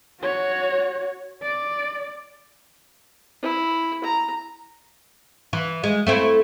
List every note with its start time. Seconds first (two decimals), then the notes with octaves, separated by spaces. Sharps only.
0.20 F#4 C#5
1.43 D5
3.43 E4
4.04 A#5
5.53 E3
5.84 G#3
6.07 A3 C4 E4